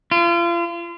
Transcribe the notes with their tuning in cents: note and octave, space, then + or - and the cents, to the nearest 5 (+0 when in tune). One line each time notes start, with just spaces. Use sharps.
F4 -35